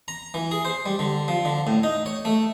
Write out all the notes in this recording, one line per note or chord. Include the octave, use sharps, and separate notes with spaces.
A#5
E3
G#4
C5
G3
D3
F3
D3
A2
D#4
C#5
A3